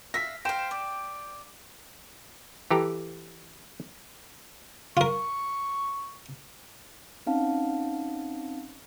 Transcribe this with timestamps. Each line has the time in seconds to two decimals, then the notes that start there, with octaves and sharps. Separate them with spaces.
0.14 E5 F5 A#6 B6
0.45 C5 F5 G5 E7
0.71 D5
2.71 E3 G4 A4 A#5
4.97 F4 A#4 C#6
7.27 C4 C#4 D#4 F5 F#5 A5